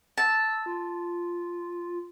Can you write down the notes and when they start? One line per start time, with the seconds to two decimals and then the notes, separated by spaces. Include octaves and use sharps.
0.18 A5 E6
0.66 F4